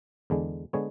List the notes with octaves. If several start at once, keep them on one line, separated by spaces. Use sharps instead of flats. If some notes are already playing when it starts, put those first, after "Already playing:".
E2 D3 G#3
D3 G#3 B3 C#5